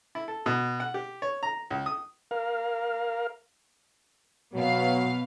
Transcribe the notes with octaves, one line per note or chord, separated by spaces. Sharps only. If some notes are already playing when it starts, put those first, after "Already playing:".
E4
A4
B2
F#5
G4
C#5
A#5
C#2
D#6
A#4 F5
B2 F#3 F5